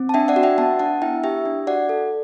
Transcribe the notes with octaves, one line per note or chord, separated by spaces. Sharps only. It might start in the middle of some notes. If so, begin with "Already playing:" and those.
Already playing: C4
A5
D4 E5 G5
D5 F#5
F#4
E5 G5
B3 F#5 A5
D4 F#5 A5
E4 E5 G5
G4 E5 G5
D4
F#4 D5 F#5
A4